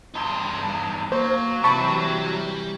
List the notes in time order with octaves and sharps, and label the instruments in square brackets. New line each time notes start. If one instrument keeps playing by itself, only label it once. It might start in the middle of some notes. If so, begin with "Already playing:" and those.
[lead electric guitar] E2 G2 [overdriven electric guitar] D#4 C6
[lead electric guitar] F#3 [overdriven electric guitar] A#3 [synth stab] C5
[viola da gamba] C3 E3 [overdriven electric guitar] G3 [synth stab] A5 B5 C#6